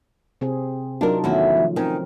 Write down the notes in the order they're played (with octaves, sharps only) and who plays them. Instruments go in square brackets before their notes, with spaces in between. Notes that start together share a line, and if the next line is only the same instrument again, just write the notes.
[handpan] C3 C4 G#4
[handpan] F#3 D#4 F4 [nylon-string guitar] D4 A#4
[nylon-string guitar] E2 E4 F#4 [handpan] D#3 A3 C#4
[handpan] F3
[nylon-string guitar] D#3 C#4 [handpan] C4 A#4